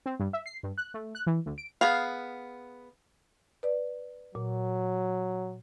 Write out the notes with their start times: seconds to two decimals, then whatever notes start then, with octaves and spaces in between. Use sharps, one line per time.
0.06 C4
0.20 G2
0.33 E5
0.46 C7
0.63 G2
0.78 F#6
0.94 A3
1.15 F#6
1.27 E3
1.46 D2
1.58 D7
1.81 B3 G#4 F5
3.63 B4 D5
4.35 A#2 F#3